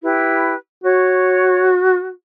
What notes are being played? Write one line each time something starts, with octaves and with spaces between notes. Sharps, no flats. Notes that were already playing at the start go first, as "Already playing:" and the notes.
E4 G4 B4
F#4 C#5